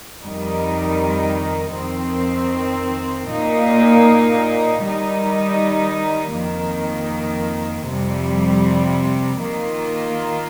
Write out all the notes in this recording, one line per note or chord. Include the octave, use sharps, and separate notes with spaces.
F2 D#3 G3 D#4
F2 D#3 C4
A#2 A#3 D#4
D#3 G3 D#4
F2 D#3 A#3
F2 C3 G3
D#3 A#3 F4